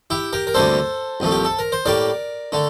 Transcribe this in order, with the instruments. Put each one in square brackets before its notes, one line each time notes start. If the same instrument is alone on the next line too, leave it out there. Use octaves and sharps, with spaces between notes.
[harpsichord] E4 G4
G4 A#4
A#4
D2 C3 G3 A#3 A4 C5
C2 A#2 F3 A3
G4
A4
A#4
C5
A2 G3 A#3 A#4 D5
D3 A3